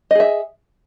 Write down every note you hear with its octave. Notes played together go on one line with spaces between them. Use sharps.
G#4 D#5 E5